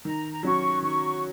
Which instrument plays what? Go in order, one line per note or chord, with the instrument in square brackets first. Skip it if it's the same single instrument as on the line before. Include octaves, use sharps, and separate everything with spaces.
[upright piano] D#3 [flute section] A#5
[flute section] A#5
[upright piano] F#3 C#4 F#4 [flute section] C#6
[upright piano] D#3 [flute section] C#6